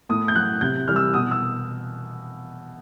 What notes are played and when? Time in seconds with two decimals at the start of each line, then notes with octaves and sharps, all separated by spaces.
0.09 A2 D#6
0.28 G6
0.36 F#3 F#6
0.61 C3 G6
0.87 E3 G3 F6
0.96 E6
1.14 B2 D#6
1.31 E6